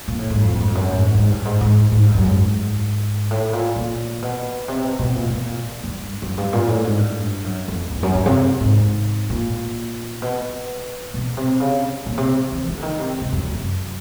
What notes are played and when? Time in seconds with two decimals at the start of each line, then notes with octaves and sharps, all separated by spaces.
0.08 A#2
0.19 A2
0.30 G#2
0.42 F2
0.53 G2
0.61 F#2
0.68 F2
0.75 F#2
0.90 A2
1.00 G#2
1.15 G#2
1.30 G2
1.45 G#2
1.61 G#2
1.92 G#2
2.03 G2
2.14 F#2
2.26 G#2
3.31 A2
3.53 A#2
3.76 A#2
4.22 B2
4.68 C3
4.84 B2
4.99 B2
5.15 A#2
5.30 B2
5.45 A#2
5.84 G2
6.22 F#2
6.37 G2
6.53 A#2
6.68 A2
6.84 G#2
6.99 G2
7.45 F#2
7.68 F2
7.91 E2
8.03 F#2
8.14 G2
8.26 C3
8.60 G#2
9.30 A#2
10.22 B2
11.14 B2
11.37 C3
11.60 C#3
12.06 A#2
12.18 C3
12.52 E3
12.68 E3
12.77 D3
12.83 D#3
12.98 C3
13.21 C3
13.32 F#2
13.45 F#2